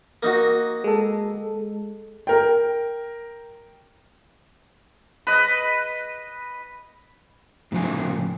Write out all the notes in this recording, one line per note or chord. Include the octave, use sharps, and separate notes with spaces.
A#3 D#4 F#4
G#3 A4
A#4 G5
B4 D#5
A2 C#3 F3 G#5